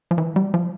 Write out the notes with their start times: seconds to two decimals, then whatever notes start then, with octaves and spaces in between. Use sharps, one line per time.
0.11 F3
0.18 E3
0.36 G3
0.54 F3